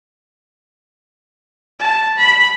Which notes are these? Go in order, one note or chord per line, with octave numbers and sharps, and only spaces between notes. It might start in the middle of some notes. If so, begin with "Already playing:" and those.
A5
B5